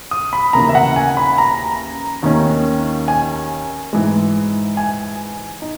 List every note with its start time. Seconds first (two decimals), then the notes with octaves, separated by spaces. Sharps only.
0.11 D#6
0.33 B5
0.53 D#2 C#3 E3 A#3 A#5
0.69 E5
0.75 F#5
0.96 G#5
1.17 B5
1.38 A#5
2.23 D#2 D#3 A#3 C#4
3.08 G#5
3.93 G#2 E3 G#3
4.77 G#5
5.62 D#4